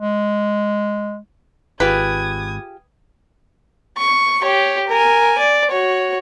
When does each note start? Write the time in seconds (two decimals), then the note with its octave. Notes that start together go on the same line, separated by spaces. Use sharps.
0.01 G#3
1.80 G#1 F4 G4 G#4 B4 D#6 G#6
3.98 C#6
4.43 G4 C#5
4.88 A#4 G#5
5.38 D5
5.71 F#4 C#5